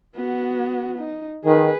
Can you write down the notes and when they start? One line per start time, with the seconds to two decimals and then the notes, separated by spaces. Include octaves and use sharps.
0.16 B3 F#4
0.98 D#4
1.45 D#3 G#4 B4